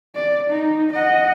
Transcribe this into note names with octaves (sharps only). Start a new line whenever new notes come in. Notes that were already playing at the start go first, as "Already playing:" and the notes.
D5
D#4
D#5 F#5